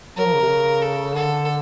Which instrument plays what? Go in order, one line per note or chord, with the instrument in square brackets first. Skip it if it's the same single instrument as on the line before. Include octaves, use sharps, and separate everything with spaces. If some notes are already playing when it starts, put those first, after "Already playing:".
[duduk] F#3 [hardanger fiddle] A#4
[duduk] F3
C#3
C3
C#3
[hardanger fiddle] A4
[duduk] D3 [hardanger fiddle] A4